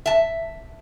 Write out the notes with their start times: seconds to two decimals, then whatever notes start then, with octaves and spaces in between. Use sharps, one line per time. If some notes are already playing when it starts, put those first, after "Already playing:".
0.06 E5 A5